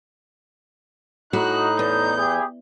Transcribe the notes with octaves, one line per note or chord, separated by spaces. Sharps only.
A2 D#4 F#4 F#6
E2 G6
E4 G4 G#4